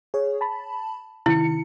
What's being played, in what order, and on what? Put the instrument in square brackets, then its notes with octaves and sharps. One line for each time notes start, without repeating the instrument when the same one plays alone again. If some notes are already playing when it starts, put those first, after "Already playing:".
[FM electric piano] G#4 C#5
A5 B5
[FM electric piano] C3 D#3 C#7 [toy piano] E4